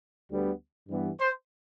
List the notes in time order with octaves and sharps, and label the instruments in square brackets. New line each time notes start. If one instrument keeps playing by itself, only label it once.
[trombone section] D2 D3 G3 B3
G2 E3 G3 B3
[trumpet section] C5